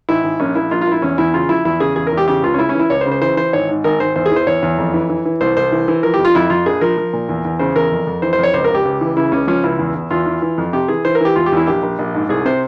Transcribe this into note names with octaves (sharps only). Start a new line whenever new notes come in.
G#1 E4
G#1
A#1 C#4
A#1 E4
A#1 F4
F4
A#1
E4
E2 C#4
E2 E4
C#3 F4
F3 E4
E2 E4
C#3 G#4
E2 G#4
A#4
E2
G4
C#3 G4
C#2 F4
C#4
C#3 E4
C#4
E3 E4
C#2 C#5
C5
C#3
C5
E3 C5
E3 C5
G#1 C#5
G#2
G#1 A#4
G#1 C5
E2 C5
G#4
E3 C5
E2 C#5
E2
F2
E3
E3
E3
C2 C5
C2 C5
E3
E3
F3 A#4
G4
F2
F4
F2 E4
F2 F4
A#1 G#4
F3 A#4
F3
A#2
E2
E2
C#3 C5
E2 A#4
F2
F2
E3 C5
C5
F2 C#5
C#2 C5
A#4
C#2 G4
C#2
E3
C#3 E4
C#2 C#4
F3 C#4
C#2 E4
E2
E2
E2 F4
E3
E3
F2
C3 G4
E3 G#4
E3 C5
A#4
E3 G4
E2 F4
G4
E2 E4
A#1 G4
A#1
A#1
G#2
C2 G#4
C3 C5